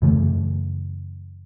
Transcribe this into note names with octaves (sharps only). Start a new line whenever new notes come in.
F#2 C#3 E3 A3